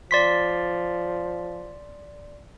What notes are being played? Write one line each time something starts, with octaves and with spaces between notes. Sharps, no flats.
F3 D5 C6 B6